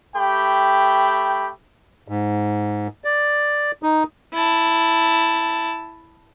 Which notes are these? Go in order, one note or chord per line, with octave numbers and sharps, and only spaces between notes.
A3 G4 G5 B5
G#2
D5
D#4
E4 A5